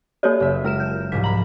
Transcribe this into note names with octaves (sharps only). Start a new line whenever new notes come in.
A#3 G4 A4 C#5 D5
F#1 E5
G#3 A#4 F6 E7
G6
C2 G#2 F3 B6
A#5 B5 F#7